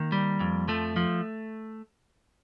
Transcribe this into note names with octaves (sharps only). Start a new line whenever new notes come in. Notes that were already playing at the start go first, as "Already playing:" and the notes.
Already playing: D#3 A#3
G3
F2
F3 A3
F3